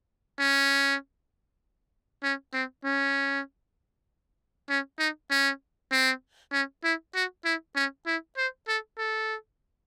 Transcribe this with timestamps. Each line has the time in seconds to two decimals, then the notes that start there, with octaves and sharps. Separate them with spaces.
0.40 C#4
2.24 C#4
2.54 C4
2.85 C#4
4.70 C#4
4.99 D#4
5.31 C#4
5.92 C4
6.52 C#4
6.84 E4
7.15 F#4
7.45 E4
7.76 C#4
8.07 E4
8.37 C5
8.68 A4
8.98 A4